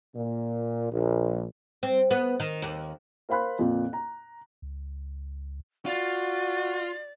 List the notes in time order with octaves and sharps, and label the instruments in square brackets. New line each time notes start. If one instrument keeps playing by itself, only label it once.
[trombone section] A#2
A#1
[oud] C4
B3
D#3
D#2
[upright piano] A#4 C5 F5 B5 C6 F#6
F2 A#2
A#5
[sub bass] C#2
[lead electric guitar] F4 [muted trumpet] F#4 [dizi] D5